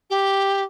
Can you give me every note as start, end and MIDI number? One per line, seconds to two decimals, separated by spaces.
0.10 0.62 67